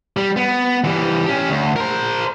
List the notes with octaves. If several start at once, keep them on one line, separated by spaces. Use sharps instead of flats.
G3
B3
E3 G3
C#4 G4
D2
A#4 C5